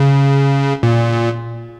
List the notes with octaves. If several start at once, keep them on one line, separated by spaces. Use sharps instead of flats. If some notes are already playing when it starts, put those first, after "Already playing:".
Already playing: C#3
A#2